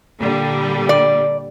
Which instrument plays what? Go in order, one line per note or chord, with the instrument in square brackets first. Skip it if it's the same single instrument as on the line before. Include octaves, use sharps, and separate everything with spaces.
[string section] A#2 D3 G3
[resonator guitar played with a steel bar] D5